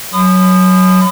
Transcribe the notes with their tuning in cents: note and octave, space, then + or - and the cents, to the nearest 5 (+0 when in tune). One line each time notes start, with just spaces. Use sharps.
F#3 +0 B5 +35 D#6 -25